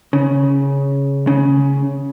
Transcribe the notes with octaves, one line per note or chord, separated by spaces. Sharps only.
C#3
C#3